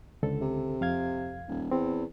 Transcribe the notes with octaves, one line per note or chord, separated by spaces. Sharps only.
C#2 D3 A4
C3
F2 F5 G#6
D#1
E2 C4